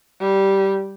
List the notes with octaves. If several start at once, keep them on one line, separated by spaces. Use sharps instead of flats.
G3